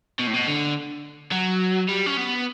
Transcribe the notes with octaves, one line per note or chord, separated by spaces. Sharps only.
B2
A2
B2
D3
F#3
G3
C#4
B3